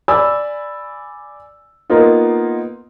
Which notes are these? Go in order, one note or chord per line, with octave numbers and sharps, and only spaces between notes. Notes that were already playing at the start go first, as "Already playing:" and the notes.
D5 G#5 B5 E6
A#3 B3 D#4 F4